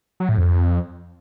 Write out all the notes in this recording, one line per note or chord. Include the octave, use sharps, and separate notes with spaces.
F#3
A2
F2